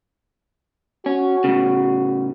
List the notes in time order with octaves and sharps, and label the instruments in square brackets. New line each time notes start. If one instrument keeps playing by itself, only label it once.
[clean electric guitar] C#4 [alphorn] F#4
[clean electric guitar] A2 C#3